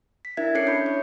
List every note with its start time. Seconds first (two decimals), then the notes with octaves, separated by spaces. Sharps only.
0.25 B6
0.37 D4 E4 A#4 E5 G#6
0.55 C#4 A4 C#5 C7 C#7
0.67 B5 G6
0.86 C#5